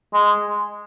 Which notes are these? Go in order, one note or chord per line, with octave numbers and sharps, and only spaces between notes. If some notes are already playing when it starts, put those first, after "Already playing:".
G#3